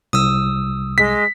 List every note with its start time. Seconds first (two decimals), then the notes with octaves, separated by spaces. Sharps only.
0.13 C2 D#6 E6
0.98 G#3 B6